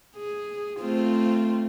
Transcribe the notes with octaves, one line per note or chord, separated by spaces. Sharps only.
G#4
A3 C4 F4